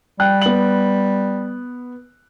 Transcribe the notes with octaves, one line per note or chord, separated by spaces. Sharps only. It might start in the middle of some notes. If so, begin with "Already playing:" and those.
G3 G5 F#6
B3 F#7